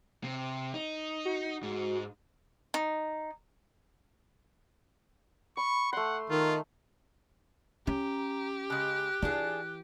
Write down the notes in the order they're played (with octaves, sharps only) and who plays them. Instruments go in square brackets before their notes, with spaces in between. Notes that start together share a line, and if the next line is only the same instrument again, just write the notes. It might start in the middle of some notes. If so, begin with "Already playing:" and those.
[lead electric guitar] C3
D#4
[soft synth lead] F#4
[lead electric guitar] G#2
[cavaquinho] D#4
[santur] B5 [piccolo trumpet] C#6
[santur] A3 C6 [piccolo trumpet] F#5
[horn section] D#3 A#4 [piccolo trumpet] F4
[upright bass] C#4 [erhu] G4 [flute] A#5
[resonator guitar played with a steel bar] C#3 G#3 [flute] F#6
[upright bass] E3 [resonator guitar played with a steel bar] D4 F4 G#4